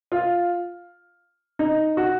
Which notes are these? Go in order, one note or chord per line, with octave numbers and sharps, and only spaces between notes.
F4
D#4
F#4